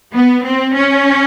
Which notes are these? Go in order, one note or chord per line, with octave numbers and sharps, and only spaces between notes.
B3
C4
C#4